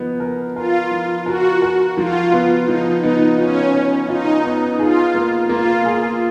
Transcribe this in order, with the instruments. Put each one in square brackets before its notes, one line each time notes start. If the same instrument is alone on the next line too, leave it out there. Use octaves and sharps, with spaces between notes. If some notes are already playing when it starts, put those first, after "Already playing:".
Already playing: [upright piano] F3 B3 D#4
A#4
[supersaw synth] F4 [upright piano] A#4
[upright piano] F3
[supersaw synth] F#4 [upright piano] A#4
[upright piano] A#4
[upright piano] F3 [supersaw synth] F4
[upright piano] B3
[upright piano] F3 [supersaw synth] D#4
[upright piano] B3 [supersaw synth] D#4
[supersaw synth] C#4 [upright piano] F4
[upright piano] B3
[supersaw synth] D#4 [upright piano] F4
[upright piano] B3
[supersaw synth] F4 [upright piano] G#4
[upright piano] A#3
[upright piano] A#3 [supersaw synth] F4
[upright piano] G#4